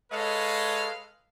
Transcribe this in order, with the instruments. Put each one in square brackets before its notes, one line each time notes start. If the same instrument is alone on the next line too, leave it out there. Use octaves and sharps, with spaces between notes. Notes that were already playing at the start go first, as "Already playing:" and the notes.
[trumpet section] G#3 A4 B4 C#5 D#5 F5